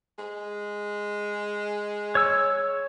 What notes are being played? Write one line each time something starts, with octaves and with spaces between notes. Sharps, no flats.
G#3
C#5 E6